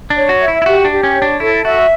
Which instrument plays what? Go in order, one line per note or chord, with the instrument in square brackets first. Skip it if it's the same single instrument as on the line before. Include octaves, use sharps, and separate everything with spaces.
[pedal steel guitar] D4
[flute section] C#5
[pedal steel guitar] F#4
[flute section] E5
[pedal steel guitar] E4
E4
[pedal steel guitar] F#4 [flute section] G4
[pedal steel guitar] D4
[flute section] G4
[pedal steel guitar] C#4
[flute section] C#5
[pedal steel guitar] D4
[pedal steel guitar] E4 [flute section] A4
[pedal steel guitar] F#4 [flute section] E5